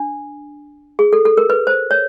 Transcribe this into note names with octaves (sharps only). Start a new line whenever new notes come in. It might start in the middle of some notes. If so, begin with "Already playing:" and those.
Already playing: D4
G#4
A4
A4
A#4
B4
C5
C#5